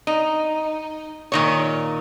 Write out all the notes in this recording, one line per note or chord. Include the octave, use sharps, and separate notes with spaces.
D#4
A#2 D#3 C#5